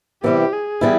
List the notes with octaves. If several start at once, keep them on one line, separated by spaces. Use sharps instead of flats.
C3 E3 G3 B3 E4 G4
G#4
E3 G3 B3 E4